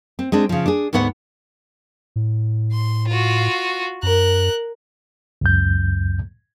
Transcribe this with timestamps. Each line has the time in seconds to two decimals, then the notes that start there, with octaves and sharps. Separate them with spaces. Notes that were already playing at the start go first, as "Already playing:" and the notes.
0.19 C4
0.32 G#3 C4 D4
0.49 C#3 F3
0.66 D4 G#4
0.93 D2 G#2 B3 C#5 F#5
2.16 A2
2.72 C6
3.08 F4 F#4
4.03 F#2 A#4 F#6
5.41 C#2 F#2 G6